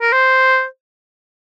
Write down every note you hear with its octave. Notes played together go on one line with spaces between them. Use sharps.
A#4
C5